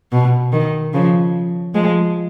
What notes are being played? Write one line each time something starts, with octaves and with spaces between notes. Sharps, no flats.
B2
D#3
C#3 F3
F3 G#3